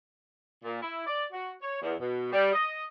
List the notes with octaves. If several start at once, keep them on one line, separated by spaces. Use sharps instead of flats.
A#2
E4
D5
F#4
C#5
E2
B2
G3
D#5